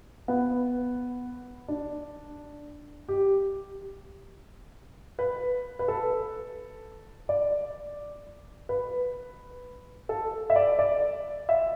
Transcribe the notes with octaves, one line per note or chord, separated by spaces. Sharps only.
B3
D4
G4
B4
B4
A4
D5
B4
A4
E5
D5
D5
E5